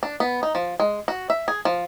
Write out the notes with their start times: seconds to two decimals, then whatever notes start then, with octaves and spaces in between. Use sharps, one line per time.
0.03 D4
0.20 B3
0.43 D#4
0.55 F3
0.80 G#3
1.08 F#4
1.30 E5
1.48 G#4
1.65 F3